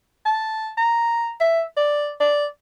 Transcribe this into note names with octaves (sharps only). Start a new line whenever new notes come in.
A5
A#5
E5
D5
D5